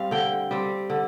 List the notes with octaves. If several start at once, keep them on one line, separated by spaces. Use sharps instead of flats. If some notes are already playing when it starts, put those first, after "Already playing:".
Already playing: G3 C4 F5
D3 G5
G3 C4
D3